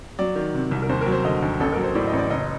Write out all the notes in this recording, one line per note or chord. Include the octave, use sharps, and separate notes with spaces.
F#3 D5
D#3
C3
C2
A#4
D#2 C5
A#4
F#3
C5
D3 D#5
D#2
A1 A4
F#3 A#4
C5
A2 D5
D#5
A1
D5
F#1 D#5